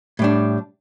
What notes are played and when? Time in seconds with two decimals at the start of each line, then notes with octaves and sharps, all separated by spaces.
0.19 A2 G3 D4